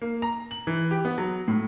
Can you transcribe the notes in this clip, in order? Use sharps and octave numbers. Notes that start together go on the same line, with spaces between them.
A#3
A#5
F#7
E3
G4
B3
F#3
A2